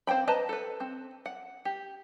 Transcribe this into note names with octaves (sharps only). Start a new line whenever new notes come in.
C4 C5 F5 G5 B5
B4 C5 D#5 A5 A#5
A4 B4
C4
F#5
G4